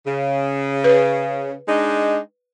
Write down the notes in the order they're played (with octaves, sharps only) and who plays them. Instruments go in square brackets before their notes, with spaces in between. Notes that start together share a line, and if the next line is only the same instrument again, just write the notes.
[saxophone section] C#3
[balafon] B4
[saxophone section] G#3 D4 D#4